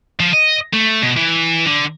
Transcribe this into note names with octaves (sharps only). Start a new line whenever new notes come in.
F3
D#5
A3
B2
E3
D3